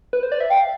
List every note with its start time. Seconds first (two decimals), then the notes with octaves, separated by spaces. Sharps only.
0.13 B4
0.23 C5
0.32 D5
0.40 E5
0.50 F5 G5